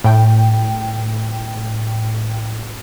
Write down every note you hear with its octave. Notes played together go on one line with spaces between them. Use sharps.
A2 G5